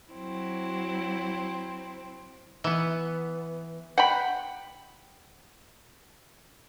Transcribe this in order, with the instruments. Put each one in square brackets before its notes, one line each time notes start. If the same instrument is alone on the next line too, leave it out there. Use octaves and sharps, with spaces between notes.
[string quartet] F#3 C4 E4
[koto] E3 B3
[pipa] F#5 G5 B5